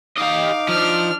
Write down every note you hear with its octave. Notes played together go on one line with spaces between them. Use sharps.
D#4 G4 D#5 F5 D6
F3 D4 F6